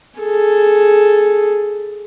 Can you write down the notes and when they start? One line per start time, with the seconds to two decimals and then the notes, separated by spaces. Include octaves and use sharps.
0.20 G#4 A4